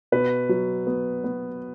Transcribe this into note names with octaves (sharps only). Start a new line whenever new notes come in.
B2 B4
F#3
B3
B3